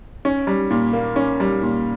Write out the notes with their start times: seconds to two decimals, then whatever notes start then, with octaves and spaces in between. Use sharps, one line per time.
0.25 C#4
0.47 G3
0.71 A#2
0.93 A#3
1.16 C#4
1.40 G3
1.62 A#2